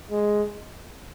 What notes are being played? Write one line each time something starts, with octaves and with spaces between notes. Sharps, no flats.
G#3